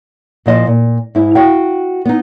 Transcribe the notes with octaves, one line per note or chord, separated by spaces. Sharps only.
A#2 F3 D#5
A#2
G#2 E4
F#4 F5 G5
B3 D#4